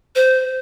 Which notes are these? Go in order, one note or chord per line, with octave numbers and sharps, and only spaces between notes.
C5